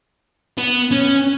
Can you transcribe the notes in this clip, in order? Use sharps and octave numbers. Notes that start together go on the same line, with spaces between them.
B3
C#4